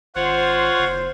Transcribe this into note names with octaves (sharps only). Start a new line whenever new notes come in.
G#1 F4 C5 C#5 F#5
F#1